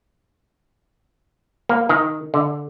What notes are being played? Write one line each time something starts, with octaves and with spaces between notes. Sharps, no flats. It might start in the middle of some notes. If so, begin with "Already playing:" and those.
A#3
D#3
D3